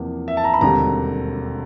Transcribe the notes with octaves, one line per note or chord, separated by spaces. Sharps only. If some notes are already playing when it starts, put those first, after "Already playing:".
Already playing: E2 C3 F3 A#3
E5
A5
A#5
B5
E1 D#2 D3 G3 C4 A#5